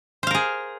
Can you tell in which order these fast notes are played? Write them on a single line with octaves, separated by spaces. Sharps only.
C5 F5 A#4 G#4